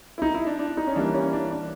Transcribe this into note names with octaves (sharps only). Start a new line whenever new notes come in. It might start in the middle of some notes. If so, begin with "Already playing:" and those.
E4
D#4
E4
D4
D4
D#4
C#4
E3 G3 A#3 D4
C#4
D4
D4